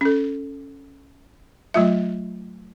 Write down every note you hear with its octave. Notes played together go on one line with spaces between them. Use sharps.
C#4 A4
F#3 A3 F4 E5